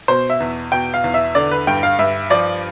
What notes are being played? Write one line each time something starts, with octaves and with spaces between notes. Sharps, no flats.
B2 C5
E5
E2
B2 G5
F5
E2
E5
D3 D5
B4
G2 G5
F5
G2 E5
F3 D5